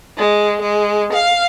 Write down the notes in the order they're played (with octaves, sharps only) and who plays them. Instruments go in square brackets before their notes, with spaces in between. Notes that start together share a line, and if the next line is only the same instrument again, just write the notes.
[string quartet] G#3
G#3
F5